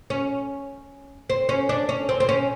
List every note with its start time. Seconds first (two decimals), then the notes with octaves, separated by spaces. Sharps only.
0.10 C#4
1.30 C4
1.49 C#4
1.69 D4
1.89 C#4
2.09 C4
2.20 C4
2.29 C#4